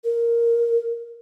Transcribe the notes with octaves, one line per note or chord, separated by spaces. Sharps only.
A#4